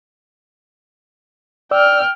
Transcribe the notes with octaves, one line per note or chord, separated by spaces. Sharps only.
D5 G5 E6 F6